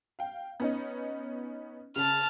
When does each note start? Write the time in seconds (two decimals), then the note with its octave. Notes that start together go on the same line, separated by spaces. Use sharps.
0.19 F5 G5
0.60 B3 C#4 D#4
1.96 C#3 A5 F6